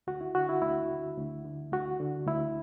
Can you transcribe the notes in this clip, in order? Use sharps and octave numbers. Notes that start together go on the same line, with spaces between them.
D2 F#4
E4
D3 F#4
E4
D2 E4
D3
D2
D3
D2 F#4
D3
D2 E4